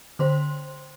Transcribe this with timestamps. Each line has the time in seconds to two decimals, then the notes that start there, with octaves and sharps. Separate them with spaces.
0.19 D3 C5 C6